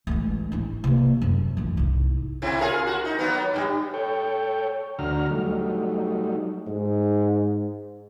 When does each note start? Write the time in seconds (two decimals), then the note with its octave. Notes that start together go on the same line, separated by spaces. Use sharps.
0.07 A1 G#3
0.52 C#4 E4
0.84 C3 A#3
1.22 F#2
1.57 A1 F2
1.77 C2 G#2
2.42 C3 C4 E4
2.60 F4 G#4 A#4
2.87 F#4
3.05 D#4
3.19 F#3 A#3 B3
3.54 G2 F#3 G3
3.94 A4 C#5 G5
4.99 D2 D3 F#4 A#5 F6
5.30 F#3 G3 A3 D#4
6.67 G#2